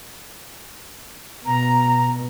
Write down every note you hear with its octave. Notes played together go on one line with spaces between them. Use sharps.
B2 A#5